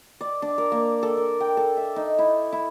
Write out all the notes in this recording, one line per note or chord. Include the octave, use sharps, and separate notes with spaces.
D5
D4
A#4
A#3
A4
A#4
G5
A4
E5
D#4
E4
E4